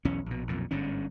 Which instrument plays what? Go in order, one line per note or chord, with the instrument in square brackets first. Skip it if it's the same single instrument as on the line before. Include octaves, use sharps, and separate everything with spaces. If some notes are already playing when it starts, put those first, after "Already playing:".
[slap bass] B1 E2 C#4
A#1 B2
B1 F2 A#2
G1 G#2 D3 C#4